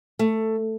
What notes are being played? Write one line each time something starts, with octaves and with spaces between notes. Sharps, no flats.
A3